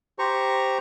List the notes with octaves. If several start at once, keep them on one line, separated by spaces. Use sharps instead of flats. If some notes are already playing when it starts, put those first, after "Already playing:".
G4 C5 A#5 C#6